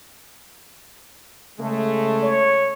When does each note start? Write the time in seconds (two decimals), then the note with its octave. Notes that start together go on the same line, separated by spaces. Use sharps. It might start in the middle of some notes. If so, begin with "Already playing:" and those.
1.58 C#3 G#3 A3
2.22 C#5